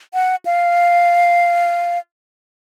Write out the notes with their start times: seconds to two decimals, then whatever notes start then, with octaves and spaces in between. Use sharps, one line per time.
0.14 F#5
0.46 F5